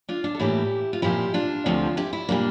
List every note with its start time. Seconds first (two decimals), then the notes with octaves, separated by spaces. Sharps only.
0.09 D4 F4
0.24 D4
0.35 A4
0.39 A2 E3 G3 A#3 E4 G4
0.93 F4
1.02 A#2 F3 C4 E4 G4
1.34 D4 F4
1.66 D2 C3 F3 C4
1.97 E4 G4
2.13 E4
2.29 A#2 G3 A#3 D4